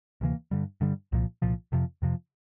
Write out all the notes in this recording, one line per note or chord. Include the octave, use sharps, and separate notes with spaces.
D2 C3 E3 A#3
G2 D3 G3
G2 D3 G3
C2 A#2 F3
C2 A#2 F3
F2 C3 F3
F2 C3 F3